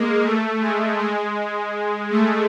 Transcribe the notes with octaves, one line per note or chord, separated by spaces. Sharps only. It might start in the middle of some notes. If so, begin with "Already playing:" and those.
Already playing: G#3 A#3
A3
G#3
G#3
A3